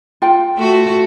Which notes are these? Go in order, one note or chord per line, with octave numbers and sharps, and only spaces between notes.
F4 G5
A3 F#4